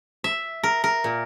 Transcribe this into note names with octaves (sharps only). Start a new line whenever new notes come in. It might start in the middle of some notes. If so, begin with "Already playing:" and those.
E5
A#4
A#4
A#2